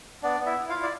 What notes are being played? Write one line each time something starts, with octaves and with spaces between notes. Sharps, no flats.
B3 D4 D5
B3
E4 E5
E4
F4 F5
E4
D5